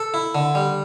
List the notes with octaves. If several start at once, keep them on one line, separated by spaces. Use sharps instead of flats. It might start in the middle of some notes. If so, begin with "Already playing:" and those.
Already playing: A4
E4
D3
G3